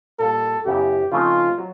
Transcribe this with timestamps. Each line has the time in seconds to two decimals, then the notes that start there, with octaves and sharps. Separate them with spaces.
0.19 A#2 G3 A#3 A4
0.66 F#2 C#3 F#3 B3 E4 G4
1.12 C#3 F3 A3 C4 D#4 F4
1.58 F#3